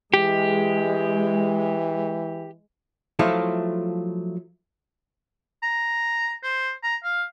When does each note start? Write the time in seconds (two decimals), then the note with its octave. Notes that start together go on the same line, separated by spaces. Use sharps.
0.14 E3 G#3 G4
3.19 F3 F#3 A3 E4 F4 A4
5.63 A#5
6.43 C5
6.83 A#5
7.04 F5